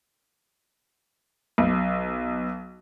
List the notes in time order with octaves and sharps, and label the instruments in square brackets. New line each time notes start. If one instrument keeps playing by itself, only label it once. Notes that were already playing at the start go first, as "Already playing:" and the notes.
[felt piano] B1